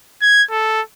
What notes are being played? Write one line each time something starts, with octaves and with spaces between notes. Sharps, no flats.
G#6
A4